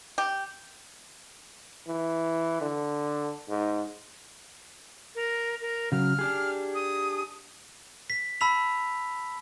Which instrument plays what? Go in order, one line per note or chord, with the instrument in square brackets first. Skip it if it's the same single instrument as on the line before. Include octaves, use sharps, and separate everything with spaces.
[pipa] G4
[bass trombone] E3
D3
G#2
[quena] A#4
A#4
[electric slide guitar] C#3 F#3 [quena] F6
[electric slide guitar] D4 G4 G#4
[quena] D#6
[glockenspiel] B6
A5 B5 E6 B6 F7